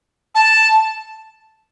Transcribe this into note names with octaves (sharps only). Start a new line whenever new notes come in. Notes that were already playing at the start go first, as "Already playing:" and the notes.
A5